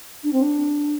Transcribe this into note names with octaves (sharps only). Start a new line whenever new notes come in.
D4
C4
D4